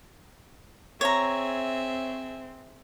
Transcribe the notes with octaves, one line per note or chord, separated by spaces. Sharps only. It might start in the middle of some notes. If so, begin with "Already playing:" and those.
C4 G#4 C#5 E5 A#5